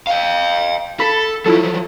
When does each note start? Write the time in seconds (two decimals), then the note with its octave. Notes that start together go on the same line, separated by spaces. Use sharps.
0.07 F5 G5
1.00 A4 B5
1.46 F3 F#3 E4 F4 A4